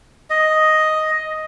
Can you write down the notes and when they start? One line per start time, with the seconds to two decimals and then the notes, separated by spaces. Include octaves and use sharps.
0.30 D#5